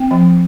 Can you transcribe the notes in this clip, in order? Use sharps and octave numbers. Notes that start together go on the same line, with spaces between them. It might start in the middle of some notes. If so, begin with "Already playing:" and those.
Already playing: C4 G5
F3